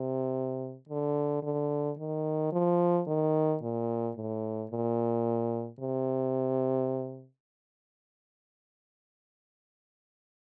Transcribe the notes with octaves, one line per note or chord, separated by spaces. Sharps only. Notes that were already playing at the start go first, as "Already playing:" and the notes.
Already playing: C3
D3
D3
D#3
F3
D#3
A#2
A2
A#2
C3